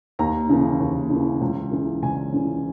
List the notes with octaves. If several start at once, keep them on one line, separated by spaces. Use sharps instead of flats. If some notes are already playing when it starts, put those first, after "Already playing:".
D#2 A#5
C#3 E3
D#2
C#3 E3
C#2
C#3 E3
C#2 G#5
C#3 E3